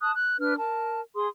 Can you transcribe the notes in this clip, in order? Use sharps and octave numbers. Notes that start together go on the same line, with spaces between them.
A5 D#6 F#6
F#6
D4 B4 F6
A#4 A5
G#4 C6 D#6